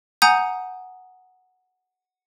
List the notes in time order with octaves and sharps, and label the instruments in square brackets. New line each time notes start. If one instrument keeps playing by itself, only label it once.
[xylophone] F#5 G#5 A#5 D#6 G6